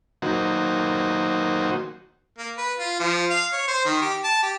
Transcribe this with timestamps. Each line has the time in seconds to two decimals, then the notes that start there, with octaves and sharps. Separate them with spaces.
0.22 D#3 F#3 A#3 D#4 F#4 C5
2.38 A#3
2.58 B4
2.78 F4
2.99 F3
3.31 F5
3.53 C#5
3.68 C5
3.85 D#3
4.02 G4
4.24 A5
4.43 G4